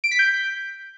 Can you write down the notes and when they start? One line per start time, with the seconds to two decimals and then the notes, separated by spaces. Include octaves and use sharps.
0.04 D7
0.11 B6
0.19 G6